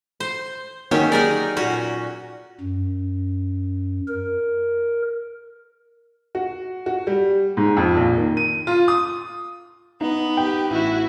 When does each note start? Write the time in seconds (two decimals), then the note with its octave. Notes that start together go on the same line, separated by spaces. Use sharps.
0.20 C5
0.91 D#3 F#3 A#3 C#4 G4 C#5
1.12 D#4 G#4 A#4 D5
1.57 A#2 C#4 F#4
2.60 F#2
4.08 A#4
6.35 F#4
6.86 F#4
7.07 G3
7.57 G#2
7.77 F2
7.97 A#1
8.17 D#3
8.37 D#7
8.67 F4
8.88 D#6
10.01 B3 D#4
10.37 G4 G5
10.70 A1 E4 F#4